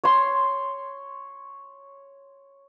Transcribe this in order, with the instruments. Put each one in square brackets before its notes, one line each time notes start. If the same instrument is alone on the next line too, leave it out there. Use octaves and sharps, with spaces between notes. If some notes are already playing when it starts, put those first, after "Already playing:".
[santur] C#5 C6